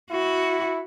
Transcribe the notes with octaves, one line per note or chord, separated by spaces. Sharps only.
E4 F#4